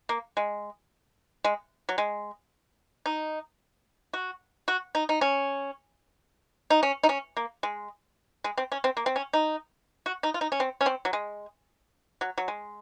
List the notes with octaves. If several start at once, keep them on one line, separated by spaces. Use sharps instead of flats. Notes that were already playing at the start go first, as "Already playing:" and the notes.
A#3
G#3
G#3
F#3
G#3
D#4
F#4
F#4
D#4
D#4
C#4
D#4
C#4
D#4
C#4
A#3
G#3
G#3
C4
C#4
C4
A#3
C4
C#4
D#4
F#4
D#4
F4
D#4
C#4
C4
C#4
C4
F#3
G#3
F#3
F#3
G#3